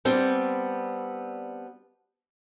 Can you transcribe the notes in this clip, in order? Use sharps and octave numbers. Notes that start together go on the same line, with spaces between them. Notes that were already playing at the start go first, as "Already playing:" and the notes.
G3 B3 C4 D4